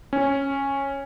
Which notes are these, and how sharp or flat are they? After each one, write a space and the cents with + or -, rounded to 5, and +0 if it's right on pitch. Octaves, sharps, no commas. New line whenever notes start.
C#4 -10